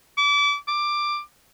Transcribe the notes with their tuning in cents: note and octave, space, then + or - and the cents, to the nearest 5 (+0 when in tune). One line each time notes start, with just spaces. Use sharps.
D6 -30
D6 +15